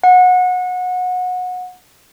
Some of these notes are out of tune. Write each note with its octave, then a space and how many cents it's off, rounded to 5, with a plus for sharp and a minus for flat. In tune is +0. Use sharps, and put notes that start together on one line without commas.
F#5 -25